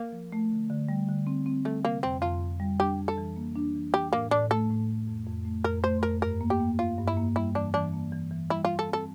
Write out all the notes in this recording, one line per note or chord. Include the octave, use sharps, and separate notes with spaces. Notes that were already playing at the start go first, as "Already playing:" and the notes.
Already playing: A#3
F3
A3
D3
D3
G3
D3
C4
C4
G3 A3
C3 A#3
F2 C4
F2 F4
F2
G3
D4 G4
F2
A4
E3
A#3
D4
E3
E3 G4
A2 A#3
A2 D4
A3 A4
A2
A2
F2
F2
A3
F2 A#4
A3 C5
F2 A#4
G2 A#4
A#3
G4
A#3
G2 F4
G2
E4
A#3
G3 E4
E3 D4
E3 D4
A#3
E3
E3
G3 E4
E3 F4
A4
C4 A4